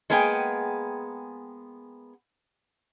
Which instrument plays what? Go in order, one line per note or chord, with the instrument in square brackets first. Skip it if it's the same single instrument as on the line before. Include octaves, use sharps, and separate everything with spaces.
[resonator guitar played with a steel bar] G#3 A#3 B3 G#4 G5